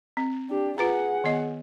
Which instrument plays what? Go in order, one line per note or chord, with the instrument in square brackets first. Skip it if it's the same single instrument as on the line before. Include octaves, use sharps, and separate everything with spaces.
[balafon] C4
[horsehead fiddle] D4 G4
[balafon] F4 B4 A#5 [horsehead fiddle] G#4 F#5
[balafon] D#3 B3 D#5